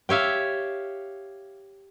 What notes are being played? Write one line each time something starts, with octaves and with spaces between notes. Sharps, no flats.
G4 C#5 E5 F5